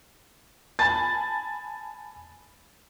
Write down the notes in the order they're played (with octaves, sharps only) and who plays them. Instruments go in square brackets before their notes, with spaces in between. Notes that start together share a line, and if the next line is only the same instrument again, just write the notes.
[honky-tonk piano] G#5 A5 B5 [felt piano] A6